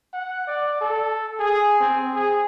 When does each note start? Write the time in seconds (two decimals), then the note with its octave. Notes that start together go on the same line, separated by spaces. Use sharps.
0.13 F#5
0.47 D5
0.81 A4
1.39 G#4
1.80 C4
2.15 G#4